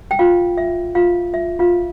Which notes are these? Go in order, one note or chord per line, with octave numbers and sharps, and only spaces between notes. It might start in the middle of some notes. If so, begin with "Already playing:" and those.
G5
F4 F5
E5
F4 F5
E5
F4 F5